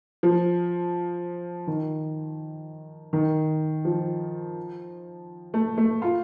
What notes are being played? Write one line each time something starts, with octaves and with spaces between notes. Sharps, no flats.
F3
D#3
D#3
F3
A3
A3
F4